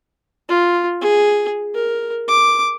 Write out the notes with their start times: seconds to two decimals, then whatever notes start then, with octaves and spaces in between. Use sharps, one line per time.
0.49 F4
1.01 G#4
1.75 A#4
2.28 D6